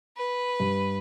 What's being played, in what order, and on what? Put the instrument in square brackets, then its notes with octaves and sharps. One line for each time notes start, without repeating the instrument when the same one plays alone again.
[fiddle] B4
[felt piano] G2